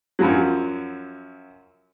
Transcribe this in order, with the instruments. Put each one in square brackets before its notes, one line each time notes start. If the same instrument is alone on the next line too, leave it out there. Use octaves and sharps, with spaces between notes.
[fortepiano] F#2 F3 F#3